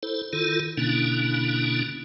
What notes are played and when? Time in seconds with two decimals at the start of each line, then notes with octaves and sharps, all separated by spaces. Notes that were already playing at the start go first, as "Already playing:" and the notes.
0.03 E4 A4 C5
0.33 D#3 E4 F4 A4
0.78 B2 D3 A#3 C#4 D4 E4